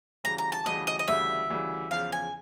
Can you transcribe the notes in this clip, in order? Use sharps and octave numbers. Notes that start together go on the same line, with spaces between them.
D2 C#3 E3 G3 A#5
A#5
A5
D2 C#3 E3 G3 D#5
D#5
D#5
D2 C#3 E3 G3 E5
D2 C#3 E3 G3
E2 C#3 F3 F5
G#5